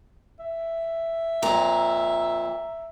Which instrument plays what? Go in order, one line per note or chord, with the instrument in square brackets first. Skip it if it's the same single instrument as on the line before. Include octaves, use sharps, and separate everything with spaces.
[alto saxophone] E5
[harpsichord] F2 A#2 [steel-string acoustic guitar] A#5